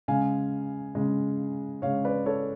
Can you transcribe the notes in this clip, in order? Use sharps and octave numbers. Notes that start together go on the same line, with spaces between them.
C#3 G#3 F5 G#5
C#3 G#3
C#3 G#3 C#5 F5
B4 D5
A4 C#5